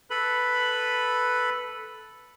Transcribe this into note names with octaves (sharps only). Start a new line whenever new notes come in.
A4 B4 B5